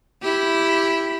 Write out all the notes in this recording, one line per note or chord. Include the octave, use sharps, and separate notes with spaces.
E4 G4